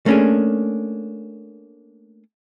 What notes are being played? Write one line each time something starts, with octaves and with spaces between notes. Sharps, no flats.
A3 A#3 C#4 D4 G#4